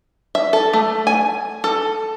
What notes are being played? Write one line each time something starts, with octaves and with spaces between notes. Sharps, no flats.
E5
A4
A3
G#5
A4